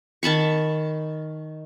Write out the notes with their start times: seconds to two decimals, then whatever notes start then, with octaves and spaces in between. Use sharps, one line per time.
0.23 D#3 A5 B5 C#6